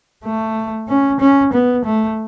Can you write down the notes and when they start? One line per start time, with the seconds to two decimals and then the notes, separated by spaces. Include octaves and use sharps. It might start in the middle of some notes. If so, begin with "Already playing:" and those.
0.25 A3
0.89 C#4
1.20 C#4
1.53 B3
1.85 A3